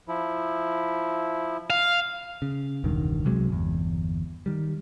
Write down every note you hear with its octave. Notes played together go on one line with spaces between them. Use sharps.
F3 E4
F5
C#3
E1 C#2 G2 D#3
C2 C3 F#3 G#3
G1 E2
D#3 G3